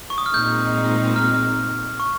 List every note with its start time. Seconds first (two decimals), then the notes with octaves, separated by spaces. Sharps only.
0.10 C#6
0.18 D#6
0.26 F6
0.33 A#2 G#3 C4 D#4 G6
1.16 F6
2.00 C#6